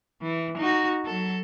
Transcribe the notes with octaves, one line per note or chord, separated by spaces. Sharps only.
E3
D#4 F#4
F#3 A4